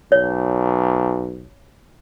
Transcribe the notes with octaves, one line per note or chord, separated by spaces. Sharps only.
B1 C#5